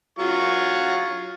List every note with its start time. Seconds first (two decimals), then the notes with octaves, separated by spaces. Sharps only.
0.19 F#3 F4 C#6